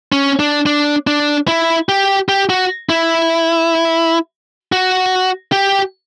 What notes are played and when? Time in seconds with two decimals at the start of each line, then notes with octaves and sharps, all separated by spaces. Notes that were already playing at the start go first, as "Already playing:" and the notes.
0.12 C#4
0.40 D4
0.66 D4
1.07 D4
1.48 E4
1.89 G4
2.29 G4
2.50 F#4
2.89 E4
4.72 F#4
5.52 G4